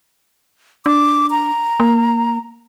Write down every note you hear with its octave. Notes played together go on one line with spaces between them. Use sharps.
D4 D6
A#5
A#3